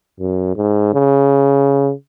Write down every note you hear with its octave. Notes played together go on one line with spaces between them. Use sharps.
F#2
G#2
C#3